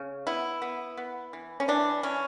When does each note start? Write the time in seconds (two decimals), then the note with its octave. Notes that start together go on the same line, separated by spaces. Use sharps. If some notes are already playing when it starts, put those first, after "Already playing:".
Already playing: C#3
0.27 B3 E4
0.62 B3
0.97 B3
1.33 E3
1.60 C#4
1.68 E3 D4
2.03 E3 C#4